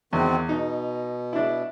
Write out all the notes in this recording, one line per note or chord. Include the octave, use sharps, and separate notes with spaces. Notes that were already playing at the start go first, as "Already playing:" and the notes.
E2 D#3 C4 F#4
B2 D#4
D4 E4